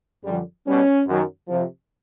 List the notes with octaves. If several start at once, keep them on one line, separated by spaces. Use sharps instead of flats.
F#2 D3 F3 G3
B2 G3 C#4
F#2 D#3 F#3
F2 C3 F3